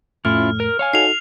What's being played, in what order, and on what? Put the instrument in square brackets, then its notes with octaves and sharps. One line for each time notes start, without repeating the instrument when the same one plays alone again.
[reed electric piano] F2 A2 A3 [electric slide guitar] C#4 E4 F4 [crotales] F6
[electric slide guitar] A#4
C#5 F5 G#5
[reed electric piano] D#4 F#4 A4 [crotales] C7 F7